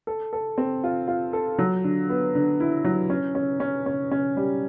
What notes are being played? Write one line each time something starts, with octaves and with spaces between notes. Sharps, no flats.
A4
A4
C4
F4
F4
A4
F#3
D3
B3
D3
E4
F#3
C#4
C#4
C#4
C#4
C#4
G3